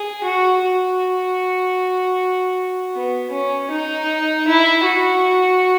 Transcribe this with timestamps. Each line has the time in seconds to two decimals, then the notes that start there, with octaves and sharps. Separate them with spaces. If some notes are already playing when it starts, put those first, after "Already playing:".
Already playing: G#4
0.24 F#4
0.63 F#4
2.93 B3
3.31 C#4
3.70 D#4
4.48 E4
4.85 F#4